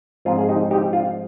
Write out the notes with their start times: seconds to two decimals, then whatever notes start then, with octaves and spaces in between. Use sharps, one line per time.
0.25 G#2 F3 G#3 C4 F4
0.39 G#4
0.49 D#4 G4
0.71 D#4 G4
0.93 F4